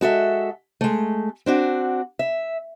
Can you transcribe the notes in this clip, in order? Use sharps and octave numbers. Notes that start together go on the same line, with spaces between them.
G#3 F#4 A4 E5
G#3 A3
C4 D4 F#4
E5